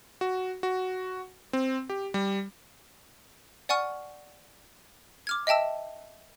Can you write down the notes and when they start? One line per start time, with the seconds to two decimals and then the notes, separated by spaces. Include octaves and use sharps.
0.21 F#4
0.63 F#4
1.53 C4
1.90 G4
2.14 G3
3.69 D5 F#5 G#5 C#6 F6
5.27 D6 F6 G#6
5.47 D#5 E5 G5 A5 E6